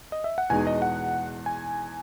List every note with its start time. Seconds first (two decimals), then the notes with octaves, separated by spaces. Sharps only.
0.12 D#5
0.24 E5
0.38 F#5
0.50 E2 B2 G#3 D#4 G#5
0.67 D#5
0.82 F#5
1.46 G#5